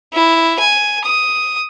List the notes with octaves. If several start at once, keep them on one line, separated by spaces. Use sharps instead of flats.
E4
G#5
D#6